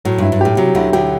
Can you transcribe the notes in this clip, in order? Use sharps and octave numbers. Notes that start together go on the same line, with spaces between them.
A2 F#3
G2 E4
G2
A2 G4
C3 F#3
D2 D3 E4
D2 D3 G4